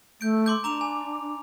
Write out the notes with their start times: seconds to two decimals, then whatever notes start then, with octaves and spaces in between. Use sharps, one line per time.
0.21 A3 G6 D7
0.46 C6 D6 G6
0.64 D4 A#5 D6 F7
0.81 G#5